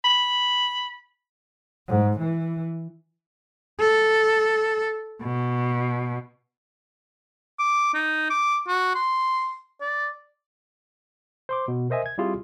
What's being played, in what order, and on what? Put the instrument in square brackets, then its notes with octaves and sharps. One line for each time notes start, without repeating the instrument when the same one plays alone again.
[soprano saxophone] B5
[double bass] G#2
E3
[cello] A4
B2
[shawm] D6
D#4
D6
F#4
C6
D5
[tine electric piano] C5 C6 D6
B2
A#4 C5 D#5 E5 G#5
G#6
G3 C4 E4 F4 G4 G#4